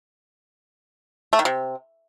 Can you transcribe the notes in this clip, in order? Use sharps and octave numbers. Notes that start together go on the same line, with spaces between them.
A3
D#3
C3